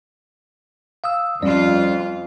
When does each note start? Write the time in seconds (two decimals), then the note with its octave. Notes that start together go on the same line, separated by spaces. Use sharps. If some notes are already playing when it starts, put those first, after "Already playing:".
1.04 F5 D#6 E6
1.42 F2 G3 C#4 F4 D5